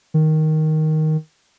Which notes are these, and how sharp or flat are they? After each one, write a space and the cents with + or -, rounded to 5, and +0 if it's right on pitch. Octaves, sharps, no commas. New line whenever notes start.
D#3 +5